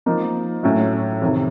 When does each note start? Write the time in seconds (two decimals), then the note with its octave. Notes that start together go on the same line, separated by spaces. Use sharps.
0.06 F3 A#3 D#4
0.63 A2 F#3 A3 C#4
1.22 F2 C3 D#3